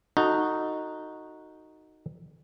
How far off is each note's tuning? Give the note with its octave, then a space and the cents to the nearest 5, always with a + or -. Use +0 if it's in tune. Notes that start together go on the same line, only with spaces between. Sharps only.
D#4 +0 F#4 -10 A4 +25